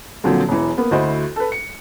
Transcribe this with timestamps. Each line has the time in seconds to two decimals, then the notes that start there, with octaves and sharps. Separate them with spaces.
0.24 A#2 D3 F3 F#3 C4
0.49 E1 E3
0.77 A#3 B3
0.91 D2 E4 F#4 C5 D#5
1.36 A4 B4
1.52 C#7